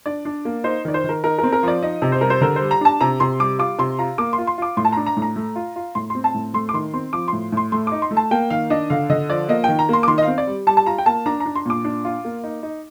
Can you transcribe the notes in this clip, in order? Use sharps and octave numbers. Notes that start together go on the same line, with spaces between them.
D4 D5
D4
A#3
D#4 C5
D#3 D5
C5
D#3 A#4
D#4 A#4
C4 A#4
A#4
F3 D5
D#4 D#5
C3
C5
G3 A#4
C5
D3 A#4
C5
G3
A#5
D4 A5
C3 A#5
C3 C6
G3 D6
F4 D6
C3 C6
F4 A#5
A#3 D6
C6
F4
C6
F4 D6
A2 C6
A5
D4 A#5
A#5
A2
A#5
A3
F4
F4
A2 C6
C4 C6
A5
A2
A3 C6
D6
D#3 C6
C4 C6
F3 D6
A2 C6
A2 C6
A3 C6
D#4 D6
C6
A3
A5
A#3 G5
D#3 F5
D4 D#5
D3 F5
D3 D#5
F3 D5
A#3 D#5
D#3 G5
A#5
A#3 C6
D6
D#3 C6
D#5
F5
C4
D5
G3
G3 A5
A5
F4 A#5
G5
A#3 A5
D4 A#5
A#5
D4
C6
A#2 D6
D4
F4
A#3
D#4
D#4